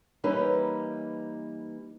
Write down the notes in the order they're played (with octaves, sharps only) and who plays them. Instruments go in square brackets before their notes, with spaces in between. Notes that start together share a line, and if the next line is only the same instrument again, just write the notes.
[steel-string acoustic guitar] E3 G3 A#3 C#4 D#4 B4